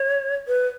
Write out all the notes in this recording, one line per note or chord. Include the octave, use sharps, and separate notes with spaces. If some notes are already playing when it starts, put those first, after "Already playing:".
Already playing: C#5
B4